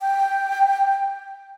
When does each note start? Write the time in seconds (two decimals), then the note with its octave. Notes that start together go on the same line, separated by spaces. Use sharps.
0.01 G5